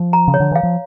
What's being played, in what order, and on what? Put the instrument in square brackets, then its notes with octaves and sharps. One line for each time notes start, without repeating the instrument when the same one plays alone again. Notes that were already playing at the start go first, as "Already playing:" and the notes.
Already playing: [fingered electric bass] F3
[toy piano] A#5
[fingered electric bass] C#3
[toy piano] C#5
[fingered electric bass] D3
[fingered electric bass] E3 [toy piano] F5
[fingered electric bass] F3